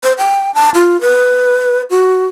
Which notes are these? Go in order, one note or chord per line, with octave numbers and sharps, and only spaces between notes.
C5
G5
A5
F4
B4
F#4